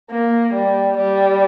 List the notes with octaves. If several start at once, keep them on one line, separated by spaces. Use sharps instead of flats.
A#3
G3
G3